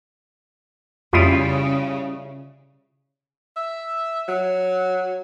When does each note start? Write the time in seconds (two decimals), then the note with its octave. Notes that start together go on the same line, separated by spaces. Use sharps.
1.13 F2 C#3 G3 E4 F4 D#6
3.56 E5
4.28 F#3